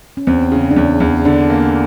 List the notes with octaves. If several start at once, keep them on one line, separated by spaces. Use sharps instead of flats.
C#4
E2 C4
C#3
D4
E2 C#4
E2
D3 D4
A#3